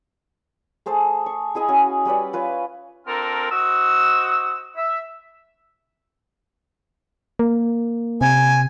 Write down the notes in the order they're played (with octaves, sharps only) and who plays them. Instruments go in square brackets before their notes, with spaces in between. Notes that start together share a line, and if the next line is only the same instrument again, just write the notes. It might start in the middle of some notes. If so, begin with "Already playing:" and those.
[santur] A3 G#4 C5 A5
C#6
E4 G#4 D#5 G#5
C#4 F#4 G#4
G3 C#4 B4 D5
F4 B4 C#5
[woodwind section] C4 D4 F4 A4 A#4
F#4 C5 D#5 E6
E5
[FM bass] A#3
[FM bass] C3 [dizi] G#5